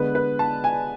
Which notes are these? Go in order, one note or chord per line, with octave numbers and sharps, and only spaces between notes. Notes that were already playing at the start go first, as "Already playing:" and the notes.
Already playing: D3 G#3 B3 B4
B4
A5
G#5